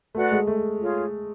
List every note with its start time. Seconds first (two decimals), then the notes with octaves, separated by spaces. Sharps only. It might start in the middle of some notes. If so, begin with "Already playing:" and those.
0.15 A3 F#4 B4 D5 F#5
0.31 G#3
0.47 A3
0.81 F4 G#4 C#5